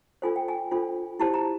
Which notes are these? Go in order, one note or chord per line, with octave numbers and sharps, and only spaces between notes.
D4 F4 A4 C5 G#5
G5
G#5
D4 F4 A4 C5
E4 G4 C5 A5
A#5